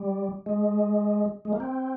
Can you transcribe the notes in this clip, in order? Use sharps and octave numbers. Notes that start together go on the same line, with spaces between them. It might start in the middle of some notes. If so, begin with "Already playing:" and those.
Already playing: G3
G#3
G#3
A#3
C4